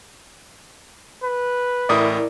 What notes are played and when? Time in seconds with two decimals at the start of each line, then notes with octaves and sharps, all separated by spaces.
1.24 B4
1.89 A1 A2 E4 A#4 D5 D#6